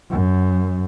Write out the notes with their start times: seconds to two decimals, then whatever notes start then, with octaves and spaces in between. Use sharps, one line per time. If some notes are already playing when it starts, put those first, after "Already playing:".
0.10 F#2